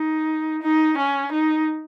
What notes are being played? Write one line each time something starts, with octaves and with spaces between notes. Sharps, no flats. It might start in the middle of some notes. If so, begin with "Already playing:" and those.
Already playing: D#4
D#4
C#4
D#4